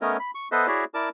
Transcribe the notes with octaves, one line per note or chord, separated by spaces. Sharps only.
A3 B3 C#4 A#4 C#5 D#5
B5
C#6
B3 A4 B4 C5 D#5 E5
E4 F#4 G#4 C#5 D5 E5
E4 A#4 D5 A5 D6